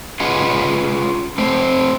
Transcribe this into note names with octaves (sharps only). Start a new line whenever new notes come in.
C#4 F4 G#4 B4 D#5 F#5
A3 C4